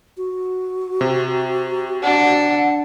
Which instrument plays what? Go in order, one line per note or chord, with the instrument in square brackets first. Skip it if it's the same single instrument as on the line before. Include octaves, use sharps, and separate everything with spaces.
[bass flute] F#4
[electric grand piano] C3
[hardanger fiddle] D4 [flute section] F#5